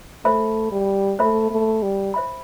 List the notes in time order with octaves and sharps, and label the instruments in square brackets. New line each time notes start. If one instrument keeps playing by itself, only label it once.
[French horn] A3 [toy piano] C5 E5 B5
[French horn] G3
[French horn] A3 [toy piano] C5 E5 B5
[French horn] A3
G3
[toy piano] C5 E5 B5